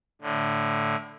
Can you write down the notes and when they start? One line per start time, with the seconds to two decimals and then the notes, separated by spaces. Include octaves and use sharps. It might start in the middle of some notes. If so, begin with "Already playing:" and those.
0.21 A2 D3